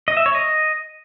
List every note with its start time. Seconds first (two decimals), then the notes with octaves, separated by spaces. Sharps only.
0.08 D#5
0.17 E5
0.26 C#5
0.35 D#5